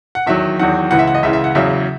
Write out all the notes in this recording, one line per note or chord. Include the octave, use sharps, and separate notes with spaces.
F#5
E2 D#3 F#3 E5
E2 D#3 F#3 F#5
C#2 C#3 E3 F#5
E5
F#5
D#5
C#2 C#3 E3 E5
E5
F#5
E2 C#3 F#3 E5